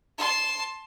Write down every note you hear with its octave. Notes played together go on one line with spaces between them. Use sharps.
A5 C6